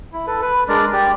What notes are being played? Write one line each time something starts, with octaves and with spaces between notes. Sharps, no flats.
E4
A4 B4
B4
G#3 D4 A#4 D5
G4 D5